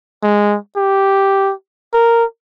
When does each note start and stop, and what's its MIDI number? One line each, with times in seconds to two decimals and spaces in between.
0.23 0.57 56
0.76 1.52 67
1.93 2.24 70